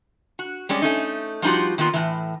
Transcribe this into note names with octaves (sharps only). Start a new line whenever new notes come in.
F#4
G3 G#3 C#4 D5
A3 C#4 D#4
F3 G3 D#4 F4 F#4
D#3 A#3 B3 F4
A2 E3